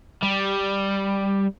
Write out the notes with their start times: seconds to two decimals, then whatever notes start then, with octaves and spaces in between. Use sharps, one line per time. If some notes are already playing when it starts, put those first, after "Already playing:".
0.23 G3